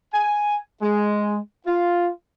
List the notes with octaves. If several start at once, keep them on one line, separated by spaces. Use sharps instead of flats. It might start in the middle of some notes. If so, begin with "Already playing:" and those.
G#5
G#3
F4